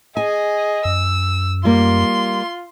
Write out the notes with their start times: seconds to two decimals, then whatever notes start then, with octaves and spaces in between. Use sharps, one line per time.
0.17 G#4 D#5 G#5
0.85 F#2 E6
1.65 G3 A#3 F4 C6